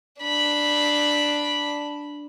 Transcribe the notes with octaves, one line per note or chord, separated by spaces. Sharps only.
D4 B5